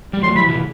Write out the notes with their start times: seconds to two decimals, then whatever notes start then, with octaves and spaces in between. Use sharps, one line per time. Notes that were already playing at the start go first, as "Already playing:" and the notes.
0.13 G3
0.23 F#3 A3 C6
0.36 E3 G3 B5
0.48 C3 E3